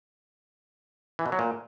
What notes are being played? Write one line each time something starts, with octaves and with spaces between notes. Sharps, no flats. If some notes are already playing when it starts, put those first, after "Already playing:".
E3
B2
F#3
A#2